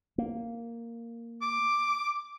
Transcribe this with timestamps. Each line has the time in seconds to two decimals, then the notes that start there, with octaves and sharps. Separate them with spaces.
0.18 A#3
1.42 D6